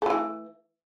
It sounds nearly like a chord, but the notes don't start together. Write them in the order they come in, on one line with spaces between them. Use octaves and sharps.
A3 F#3 E3